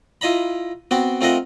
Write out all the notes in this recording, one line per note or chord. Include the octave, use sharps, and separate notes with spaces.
E4 F4 D#5 A#5 B5
B3 C4 F#4 G5
A3 C4 F4 A#4 D#5 F#5